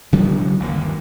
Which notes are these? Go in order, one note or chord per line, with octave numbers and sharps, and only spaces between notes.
C#3 F#3 G#3 B3
G1 D#2 A#3